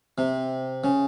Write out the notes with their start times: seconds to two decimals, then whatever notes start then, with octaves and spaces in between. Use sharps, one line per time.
0.18 C3
0.84 C#3